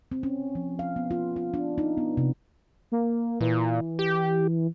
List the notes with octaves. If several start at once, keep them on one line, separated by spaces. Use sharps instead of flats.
C4
C#4
F3
F5
B3
F4
F4
D4
D#4
B3
C3
A#3
A#2 E3
G4